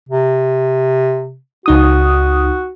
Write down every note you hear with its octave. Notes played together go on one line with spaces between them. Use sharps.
C3
C#2 D#4 F#4 D#6